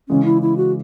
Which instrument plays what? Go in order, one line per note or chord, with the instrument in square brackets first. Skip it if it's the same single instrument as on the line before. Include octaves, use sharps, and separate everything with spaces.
[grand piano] C#3 E3 G#3 [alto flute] C#4
[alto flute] E4
E4
F#4